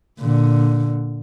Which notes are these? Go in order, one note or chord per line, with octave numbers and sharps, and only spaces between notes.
A#2 D3